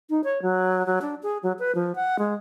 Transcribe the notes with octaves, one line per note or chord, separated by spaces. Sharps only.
D#4
C#5
F#3
F#3
D4
G#4
F#3
B4
F3
F#5
G#3